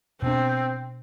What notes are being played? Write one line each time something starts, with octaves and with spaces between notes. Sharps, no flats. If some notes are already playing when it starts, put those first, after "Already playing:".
B2 B3 C4 D4